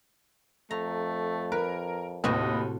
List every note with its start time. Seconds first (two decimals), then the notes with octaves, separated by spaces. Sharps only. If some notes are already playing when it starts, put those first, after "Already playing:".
0.71 F2 A3 A#5
1.52 A#4 B4
2.24 D#2 A2 C3 F#4 B4 D#5